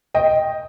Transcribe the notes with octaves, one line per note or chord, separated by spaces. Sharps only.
D#5 G5